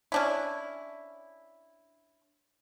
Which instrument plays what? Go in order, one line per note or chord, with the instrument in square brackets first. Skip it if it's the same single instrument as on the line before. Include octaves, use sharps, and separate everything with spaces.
[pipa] C#4 D4 E4